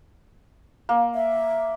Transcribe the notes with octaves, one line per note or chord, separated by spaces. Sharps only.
A#3
E5